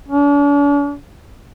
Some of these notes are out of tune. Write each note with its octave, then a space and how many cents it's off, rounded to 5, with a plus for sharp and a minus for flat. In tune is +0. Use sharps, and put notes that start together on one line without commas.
D4 -45